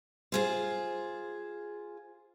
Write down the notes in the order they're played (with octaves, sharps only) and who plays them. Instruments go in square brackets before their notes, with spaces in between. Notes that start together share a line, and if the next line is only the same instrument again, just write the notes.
[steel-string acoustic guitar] F4 G#4 C5